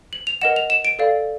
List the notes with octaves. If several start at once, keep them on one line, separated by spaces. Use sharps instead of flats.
F#7
F7
A#4 D#5 F#5 E7
F7
E7
D7
A4 D5 F5